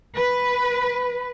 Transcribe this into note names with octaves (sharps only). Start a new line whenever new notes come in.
B4